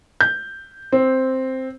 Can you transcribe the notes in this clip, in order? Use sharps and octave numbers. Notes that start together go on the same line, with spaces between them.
G6
C4